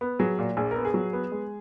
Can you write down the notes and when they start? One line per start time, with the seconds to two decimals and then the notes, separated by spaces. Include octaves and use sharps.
0.01 B3
0.19 F#3 G#4
0.38 A#2
0.57 A#1 G#4
0.71 B3 A#4
0.85 G#4
0.94 F#3
1.13 B3
1.32 G#3